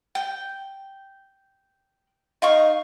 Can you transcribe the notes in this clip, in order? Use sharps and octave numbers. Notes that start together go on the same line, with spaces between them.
G5
D#4 F5 C#6